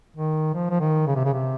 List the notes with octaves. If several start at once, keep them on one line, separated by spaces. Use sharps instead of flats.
D#3
F3
F3
D#3
C#3
C3
C#3
C3